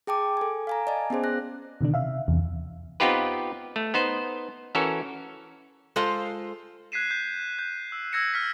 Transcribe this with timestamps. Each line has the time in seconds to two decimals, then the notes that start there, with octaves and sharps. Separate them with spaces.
0.07 G#4 G5 A5 D6
0.37 A4 G#5
0.67 F5 G#5 A#5
0.87 D5 D#5 G#5 A5
1.10 B3 C#4 G#4 C5
1.24 F#6 A#6
1.81 B2 D3 D#3 D4
1.94 C3 E5 F5
2.28 E2 C3
3.00 B3 C4 D#4 F4 G4 B4
3.76 A3
3.94 B3 D#4 C5
4.75 E3 C#4 F#4 A4 A#4
5.96 G#3 F4 A4 C5 F5
6.92 F#6 G#6 B6 C7 D#7 E7
7.11 G6
7.59 G6
7.92 E6
8.12 E6 G#6 A#6 C#7 E7
8.34 F6 B6